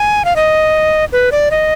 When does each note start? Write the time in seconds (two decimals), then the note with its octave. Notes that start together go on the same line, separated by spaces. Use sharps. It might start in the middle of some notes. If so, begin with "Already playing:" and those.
Already playing: G#5
0.25 F5
0.36 D#5
1.12 B4
1.32 D5
1.51 D#5